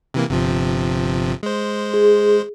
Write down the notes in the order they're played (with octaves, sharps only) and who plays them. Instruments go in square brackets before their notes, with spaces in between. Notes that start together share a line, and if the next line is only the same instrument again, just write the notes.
[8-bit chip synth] C3 E3 A#3
G1 C3 F3
G#3 C5
[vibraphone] G#4